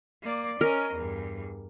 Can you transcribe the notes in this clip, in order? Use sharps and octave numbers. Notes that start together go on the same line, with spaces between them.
A#3 D5
C#4 A#4 D#5
E2 G2